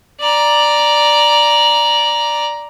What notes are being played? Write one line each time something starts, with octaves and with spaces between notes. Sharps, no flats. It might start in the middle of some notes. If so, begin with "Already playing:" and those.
D5 A#5